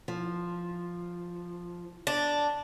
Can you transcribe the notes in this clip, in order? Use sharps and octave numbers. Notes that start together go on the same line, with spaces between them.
F3
D4